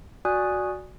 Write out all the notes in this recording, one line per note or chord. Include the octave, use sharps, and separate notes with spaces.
F#4 D5 G#5 D#6 F#6